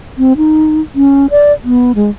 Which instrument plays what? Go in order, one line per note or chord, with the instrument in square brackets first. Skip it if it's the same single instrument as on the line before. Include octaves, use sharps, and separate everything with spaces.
[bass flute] C4
D#4
C#4
D5
B3
G#3